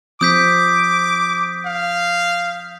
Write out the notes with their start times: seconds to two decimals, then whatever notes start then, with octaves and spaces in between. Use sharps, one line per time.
0.21 F3 C4 D6 D#6 G6 B6
1.66 F5